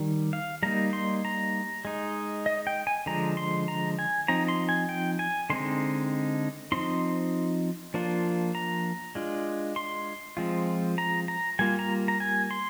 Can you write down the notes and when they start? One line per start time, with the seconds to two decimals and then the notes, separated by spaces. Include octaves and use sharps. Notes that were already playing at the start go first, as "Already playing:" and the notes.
Already playing: D#3 G3
0.33 F5
0.63 G3 A#3 D#4 A#5
0.93 C6
1.25 A#5
1.85 G#3 D#4
2.46 D#5
2.67 G5
2.87 G#5
3.06 D3 F3 G#3 A#5
3.37 C6
3.68 A#5
3.99 G#5
4.28 F3 C4 D#4 A#5
4.48 C6
4.69 G#5
4.89 G5
5.19 G#5
5.50 D3 G#3 C4 D#4 C6
6.72 F3 C4 D#4 C6
7.94 F3 A#3 D4 F4
8.55 A#5
9.15 G#3 D4 F4
9.76 C6
10.37 F3 G#3 C4 F4
10.98 A#5
11.28 A#5
11.59 G3 A#3 F4 G#5
11.79 A#5
12.08 A#5
12.20 G#5
12.51 C6